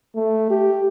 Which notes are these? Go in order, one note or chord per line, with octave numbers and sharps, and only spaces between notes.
A3
G4